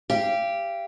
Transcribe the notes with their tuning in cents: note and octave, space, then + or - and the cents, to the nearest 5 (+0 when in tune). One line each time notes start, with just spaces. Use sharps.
G4 +0 F5 -35